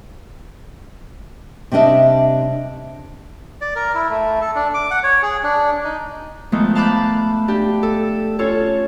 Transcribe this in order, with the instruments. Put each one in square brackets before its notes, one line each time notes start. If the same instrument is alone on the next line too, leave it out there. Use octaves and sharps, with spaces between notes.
[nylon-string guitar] C3 G3 D4 D#5 E5
[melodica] D5
A#4
E4
A3
A4
D4
D6
F#5
C#5
G#4
D4
D#4
[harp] D#3 F3 G#3 A3 B3
F5 A5 B5 D6 F#6 G6
D4 G4
A4
C#4 F4 A4 C#5